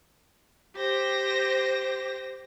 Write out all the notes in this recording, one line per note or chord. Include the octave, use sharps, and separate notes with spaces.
G4 C5 A#6